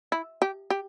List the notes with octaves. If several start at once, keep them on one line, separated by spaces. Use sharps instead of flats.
E4
G4
G4